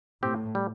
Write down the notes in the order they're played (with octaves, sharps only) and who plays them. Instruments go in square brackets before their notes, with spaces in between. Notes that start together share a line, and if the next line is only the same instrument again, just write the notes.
[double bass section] A2 [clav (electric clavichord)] C4 G4
[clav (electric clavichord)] G3